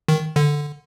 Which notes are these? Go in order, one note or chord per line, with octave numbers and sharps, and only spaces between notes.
D#3
D3